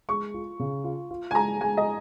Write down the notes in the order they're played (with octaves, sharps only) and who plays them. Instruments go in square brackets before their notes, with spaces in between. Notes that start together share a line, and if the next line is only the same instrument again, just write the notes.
[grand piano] G#3 [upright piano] C#6
[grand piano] F4
C#3
F4
F4
[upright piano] G#5
[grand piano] G#3 [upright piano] A#5
[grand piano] G#3 [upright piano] G#5
[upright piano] D#5